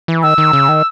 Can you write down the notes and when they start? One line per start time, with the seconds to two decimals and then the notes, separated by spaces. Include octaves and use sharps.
0.08 E3
0.23 D#3 E6
0.38 D#3
0.53 C#3
0.69 D#3